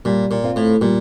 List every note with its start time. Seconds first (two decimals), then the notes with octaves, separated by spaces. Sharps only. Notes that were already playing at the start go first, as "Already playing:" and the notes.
0.05 A#2 G3
0.31 A#2
0.44 C4 F4
0.56 A2
0.81 A#2 G3